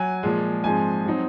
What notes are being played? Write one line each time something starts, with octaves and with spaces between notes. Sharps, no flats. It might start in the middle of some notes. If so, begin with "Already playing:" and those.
Already playing: F#3 G#5
A#2 F3 G#3
G#2 F3 G#3 C4 G#5
F#3 C4 D#4